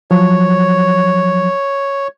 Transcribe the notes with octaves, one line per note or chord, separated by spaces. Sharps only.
F3 F#3 C#5